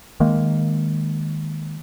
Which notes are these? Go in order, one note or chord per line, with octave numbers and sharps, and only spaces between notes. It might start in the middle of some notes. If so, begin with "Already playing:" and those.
D#3 G#3 A#3